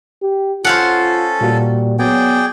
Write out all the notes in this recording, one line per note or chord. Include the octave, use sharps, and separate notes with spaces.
G4
C#4 F4 A4 C5 F5 F#5
A#2 G3 A#3 F#4
F#3 B3 G#4 D5 G5